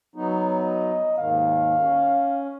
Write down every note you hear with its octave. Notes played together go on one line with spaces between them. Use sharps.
F#3 B3 D#4
D#5
D#2 G#2 D#3 F5
C#4